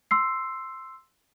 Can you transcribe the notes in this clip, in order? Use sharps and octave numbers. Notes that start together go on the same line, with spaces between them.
C6 E6 C7